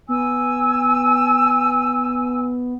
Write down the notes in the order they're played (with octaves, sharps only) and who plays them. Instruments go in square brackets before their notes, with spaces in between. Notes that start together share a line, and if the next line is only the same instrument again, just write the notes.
[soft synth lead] B3 [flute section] G#5 E6